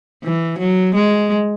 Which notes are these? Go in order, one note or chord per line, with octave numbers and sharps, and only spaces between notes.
E3
F#3
G#3